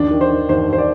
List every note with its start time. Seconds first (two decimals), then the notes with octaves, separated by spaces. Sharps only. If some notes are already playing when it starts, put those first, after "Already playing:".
Already playing: D#2 D4
0.11 D#3
0.21 C5
0.30 D#3
0.49 D#2 C5
0.68 D#2 C5
0.78 D5